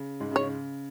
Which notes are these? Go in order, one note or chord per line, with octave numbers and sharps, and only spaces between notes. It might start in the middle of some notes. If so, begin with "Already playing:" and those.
Already playing: C#3
G#2 G#3
C#3
C#5
C#3